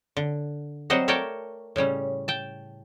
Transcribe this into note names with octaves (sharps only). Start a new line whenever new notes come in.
D3
F#3 G3 C4 C5 D#5 F#5
A3 A#4 C#5 D5 G5 A5
A2 C#3 G3 C#4
G5 A5